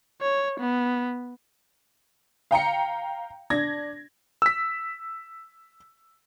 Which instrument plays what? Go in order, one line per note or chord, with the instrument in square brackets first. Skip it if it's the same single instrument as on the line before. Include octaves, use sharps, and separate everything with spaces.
[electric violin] C#5
B3
[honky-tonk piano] F5 G5 A#5 C#7
D4 G#6 A#6
[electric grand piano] E6 B6